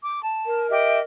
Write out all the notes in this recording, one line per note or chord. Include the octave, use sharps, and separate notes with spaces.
D6
A5
A#4
G4 D#5 E5